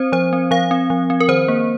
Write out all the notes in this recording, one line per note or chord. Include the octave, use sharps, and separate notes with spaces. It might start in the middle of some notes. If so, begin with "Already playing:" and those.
Already playing: C4 C5
F3 C5
C4
F3 F5
C4
F3
C4
A#4
D#3 C5
A#3